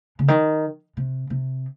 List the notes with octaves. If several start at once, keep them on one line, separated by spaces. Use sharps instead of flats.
C#3
D#3
C3
C3